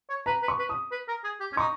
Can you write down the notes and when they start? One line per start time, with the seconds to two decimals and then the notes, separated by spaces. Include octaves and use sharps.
0.10 C#5
0.26 B4 A#5
0.42 B4
0.48 C#6
0.59 B4
0.69 D#6
0.91 B4
1.08 A#4
1.24 G#4
1.40 G4
1.53 C#4
1.57 D#4 C#6